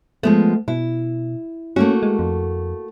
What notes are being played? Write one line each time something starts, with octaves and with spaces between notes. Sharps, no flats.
F3 G#3 A3 B3
B2 E4
A3 A#3 C#4 F#4
G#3
F2